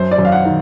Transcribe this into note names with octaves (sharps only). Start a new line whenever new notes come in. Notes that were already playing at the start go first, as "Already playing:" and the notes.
Already playing: F#2 C5
D5
F#2
F5
F#5
D#3